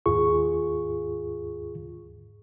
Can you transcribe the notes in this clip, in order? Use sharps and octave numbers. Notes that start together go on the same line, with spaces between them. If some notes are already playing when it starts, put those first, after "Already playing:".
D#2 G#2 F4 G#4 C#6